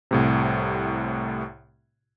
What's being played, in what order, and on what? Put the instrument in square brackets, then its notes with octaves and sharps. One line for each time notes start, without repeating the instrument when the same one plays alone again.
[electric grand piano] C2 A2 C3